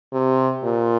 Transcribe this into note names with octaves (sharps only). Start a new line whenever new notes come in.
C3
A#2